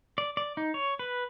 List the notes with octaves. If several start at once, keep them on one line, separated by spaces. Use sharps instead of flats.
D5
D5
D#4
C#5
B4